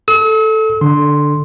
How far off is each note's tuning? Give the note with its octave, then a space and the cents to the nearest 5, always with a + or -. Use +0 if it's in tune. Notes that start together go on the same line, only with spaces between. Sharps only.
A4 +0 E6 -45
D3 +0 C6 +0